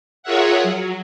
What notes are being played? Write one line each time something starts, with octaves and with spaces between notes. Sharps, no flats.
F4 G#4 A#4 C#5 E5 F#5
F#3